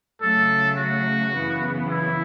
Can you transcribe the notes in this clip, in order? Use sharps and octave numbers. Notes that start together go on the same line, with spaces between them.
C#3 F#3 A3 A4
F#4
F#2 C#3 E3 B3
E4